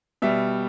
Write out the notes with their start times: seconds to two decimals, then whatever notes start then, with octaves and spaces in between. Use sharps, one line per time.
0.22 B2 G3 E5